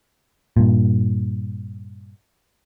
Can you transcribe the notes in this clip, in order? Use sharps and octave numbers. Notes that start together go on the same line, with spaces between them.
G2 A#2